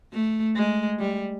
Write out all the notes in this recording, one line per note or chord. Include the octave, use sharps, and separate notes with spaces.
A3
G#3
G3